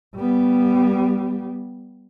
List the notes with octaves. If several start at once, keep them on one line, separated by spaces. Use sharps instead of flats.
G3 B3